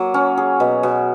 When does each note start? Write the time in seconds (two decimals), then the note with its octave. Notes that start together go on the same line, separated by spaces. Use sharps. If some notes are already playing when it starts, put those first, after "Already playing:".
Already playing: F#3 A#3
0.14 C#4
0.38 G#4
0.60 B2
0.83 B2